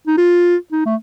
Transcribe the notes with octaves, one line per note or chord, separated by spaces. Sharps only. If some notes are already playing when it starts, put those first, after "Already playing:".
D#4
F4
D#4
A3